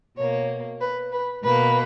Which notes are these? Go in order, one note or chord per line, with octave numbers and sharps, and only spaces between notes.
B2 A#3 C#5
B4
B4
B2 A#3 B4